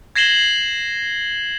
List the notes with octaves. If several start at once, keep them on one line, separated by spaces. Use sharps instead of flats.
G#6 A#6 C7 E7 F#7 G7